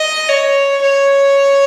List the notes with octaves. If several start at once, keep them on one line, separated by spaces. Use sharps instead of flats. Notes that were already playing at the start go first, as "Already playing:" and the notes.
Already playing: D#5
C#5
C#5